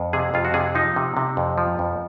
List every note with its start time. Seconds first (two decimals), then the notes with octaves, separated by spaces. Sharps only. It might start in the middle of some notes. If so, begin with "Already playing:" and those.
Already playing: F2
0.13 C3 G#4
0.34 F2 F4
0.45 F#4
0.54 C3 G#4
0.75 F3 D#4
0.96 C3
1.17 C3
1.37 F2
1.58 F3
1.79 F2